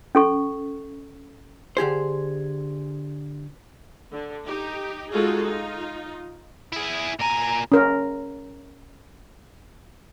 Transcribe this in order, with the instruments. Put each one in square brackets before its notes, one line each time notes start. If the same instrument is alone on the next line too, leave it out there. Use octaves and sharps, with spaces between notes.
[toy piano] C#4 A4 C#6
[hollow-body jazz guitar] D3 G4 G#4 C5
[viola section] D3
D#4 G4
G#3 D#4 F4 F#4 G#4 A4
D#4 F4
[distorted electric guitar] E4 G#4
[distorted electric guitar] A#2 G#5 [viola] A#5
[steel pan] C#4 A#4